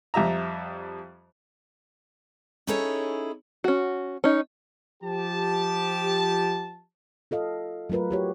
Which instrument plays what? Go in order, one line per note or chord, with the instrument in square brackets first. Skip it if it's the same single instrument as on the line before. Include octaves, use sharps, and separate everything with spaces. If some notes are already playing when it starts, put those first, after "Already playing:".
[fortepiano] F2 G3 E5 A#5
[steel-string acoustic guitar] C#4 D#4 E4 G#4 A4 C#5
[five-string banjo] C#4 F#4
C#4 D#4
[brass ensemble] F3 G4 A5
[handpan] F4 A4 D#5 F5
F#3 A3 F4 A#4 B4
F#4 G4 C#5